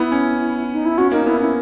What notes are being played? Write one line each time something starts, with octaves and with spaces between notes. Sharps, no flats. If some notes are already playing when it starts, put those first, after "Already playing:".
Already playing: B3 E4
C#4
D#4
E4
C#4 F#4
A#3 D#4
B3 E4
C#4 E4